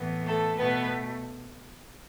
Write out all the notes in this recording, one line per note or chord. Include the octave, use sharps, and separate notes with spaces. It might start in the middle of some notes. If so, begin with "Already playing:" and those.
Already playing: A2 E3 B3
A3 A4
B2 A3 B3 B4